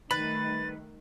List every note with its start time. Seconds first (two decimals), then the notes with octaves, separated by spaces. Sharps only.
0.11 D#3 G3 A3 B4 B5 A6